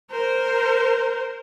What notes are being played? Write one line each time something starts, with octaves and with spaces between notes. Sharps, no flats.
A#4 C5